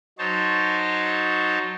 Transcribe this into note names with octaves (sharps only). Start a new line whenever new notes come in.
F#3 D#4 C5 C#5 A5